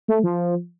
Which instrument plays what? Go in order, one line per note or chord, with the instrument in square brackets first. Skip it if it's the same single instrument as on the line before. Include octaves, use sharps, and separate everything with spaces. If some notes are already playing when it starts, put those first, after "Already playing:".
[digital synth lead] A3
F3